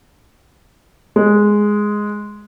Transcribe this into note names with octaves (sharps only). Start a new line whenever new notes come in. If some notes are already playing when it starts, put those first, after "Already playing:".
G#3